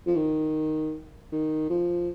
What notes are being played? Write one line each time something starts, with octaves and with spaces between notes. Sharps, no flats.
F3
D#3
D#3
F3